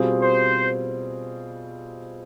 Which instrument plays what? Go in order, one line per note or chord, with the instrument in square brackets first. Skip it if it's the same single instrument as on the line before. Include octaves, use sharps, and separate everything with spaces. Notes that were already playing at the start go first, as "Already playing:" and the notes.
Already playing: [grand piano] B2 G3 C4 F4 G#4
[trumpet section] C5